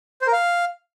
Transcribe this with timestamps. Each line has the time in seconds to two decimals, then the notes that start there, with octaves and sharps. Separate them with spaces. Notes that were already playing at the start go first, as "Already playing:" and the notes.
0.22 C5
0.27 A#4
0.33 F5